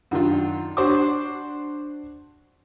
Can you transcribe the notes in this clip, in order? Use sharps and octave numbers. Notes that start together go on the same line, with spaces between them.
F#2 D#3 D4 F4
D4 F#4 C5 C#6 D6